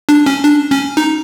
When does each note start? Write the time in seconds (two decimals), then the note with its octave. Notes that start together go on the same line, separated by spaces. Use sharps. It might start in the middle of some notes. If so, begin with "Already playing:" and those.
0.09 D4
0.26 C#4
0.44 D4
0.71 C#4
0.97 D#4